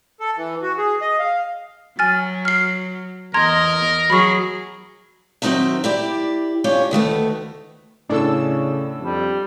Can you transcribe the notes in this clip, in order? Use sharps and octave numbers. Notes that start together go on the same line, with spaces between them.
A4
E3
F#4
G#4
D#5
F5
F#3 G#5 F6 A6
F6 C7
E2 A#4 D#5 A#5 C6 G#6
F#3 G#4 B5 C#6
D#3 F#3 C4 D#4 A#4 E5
E4 G4 D5
C#4 D4 F4 G4 C#5
D2 D#3 A3 B3
A2 C#3 D4 A4 E6
F2 G3